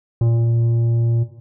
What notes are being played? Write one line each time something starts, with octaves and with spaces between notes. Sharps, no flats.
A#2